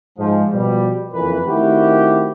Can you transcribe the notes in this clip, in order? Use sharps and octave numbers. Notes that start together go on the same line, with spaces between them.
G#2 F3
B2 F3 G3
F#1 F2 E3 A#4 B4
D#3 A3 C4 E4 F#4 G4